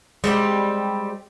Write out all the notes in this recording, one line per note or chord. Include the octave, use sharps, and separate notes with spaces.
G3 G#3 C4 G4